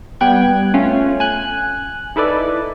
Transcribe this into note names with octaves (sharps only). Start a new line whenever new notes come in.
G3 B3 G5 F#6 G#6
A3 C#4 F4
G#5 F#6
D#4 E4 A4 B4 D5